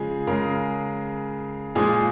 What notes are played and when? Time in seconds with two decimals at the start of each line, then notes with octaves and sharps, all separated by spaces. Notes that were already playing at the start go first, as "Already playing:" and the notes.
Already playing: C#3 F3 G#3 G#4
0.27 C#3 G#3 A#4
1.75 A#2 F3 G#3 G#4